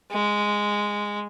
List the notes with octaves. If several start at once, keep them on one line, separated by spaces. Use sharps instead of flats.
G#3